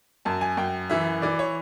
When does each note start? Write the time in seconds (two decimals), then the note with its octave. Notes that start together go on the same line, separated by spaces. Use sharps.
0.25 F#2 A5
0.41 G#5
0.57 F#2 G5
0.90 E3 E5
1.22 E3 D5
1.39 C#5